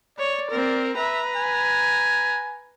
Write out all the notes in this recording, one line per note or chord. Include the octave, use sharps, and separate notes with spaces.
C#5 D5
C4 A#4
B4 E5 A#5
G#5